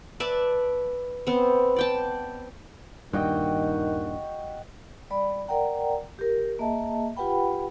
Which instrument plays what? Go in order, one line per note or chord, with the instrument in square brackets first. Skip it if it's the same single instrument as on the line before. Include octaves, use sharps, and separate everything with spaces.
[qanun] B4 D5 E5 A5
B3 C4
D5 G5 A5
[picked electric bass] D#1 G2 [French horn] D#3 [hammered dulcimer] F#4 D#5 G5
[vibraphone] G3 D5 B5
A#4 D5 F#5 G5 A#5
G4 A#4
A#3 G#4 D#5 E5 A5
F4 G4 B4 F#5 G5 B5